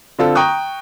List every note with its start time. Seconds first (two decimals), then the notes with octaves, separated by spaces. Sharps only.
0.19 D3 C4 F4 A4
0.35 G5 A#5 C#6 D#6 F#6